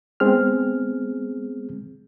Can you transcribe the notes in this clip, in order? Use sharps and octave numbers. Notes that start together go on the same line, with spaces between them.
G#3 B3 C4 G#4 F6